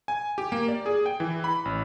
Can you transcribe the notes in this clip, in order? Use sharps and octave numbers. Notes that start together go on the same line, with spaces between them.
G#5
G4
A#3
D5
G#4
G5
E3
B5
A1